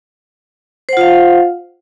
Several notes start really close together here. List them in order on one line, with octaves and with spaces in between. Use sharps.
C5 F#5 F4 F5